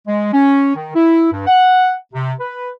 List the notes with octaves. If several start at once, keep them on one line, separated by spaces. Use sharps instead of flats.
G#3
C#4
D#3
E4
G2
F#5
C3
B4